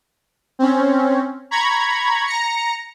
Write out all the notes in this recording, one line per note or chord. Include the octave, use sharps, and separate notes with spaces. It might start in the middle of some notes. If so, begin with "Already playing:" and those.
C4 C#4
A#5 B5 C#6 G#6
A#5 A#6 C#7